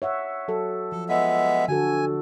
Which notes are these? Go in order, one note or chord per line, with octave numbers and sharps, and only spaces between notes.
C#5 E5 F#5
F#3 A4
F3 A4
G#3 B3 E5
D3 F#4 A4 G#5